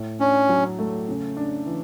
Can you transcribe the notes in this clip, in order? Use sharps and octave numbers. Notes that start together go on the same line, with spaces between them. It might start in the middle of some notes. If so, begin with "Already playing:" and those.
Already playing: A2
C#4 D4
F#3
A3
C#3
D4
E3